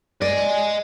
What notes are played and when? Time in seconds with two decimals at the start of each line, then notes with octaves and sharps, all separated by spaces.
0.22 D5 D#5 G#5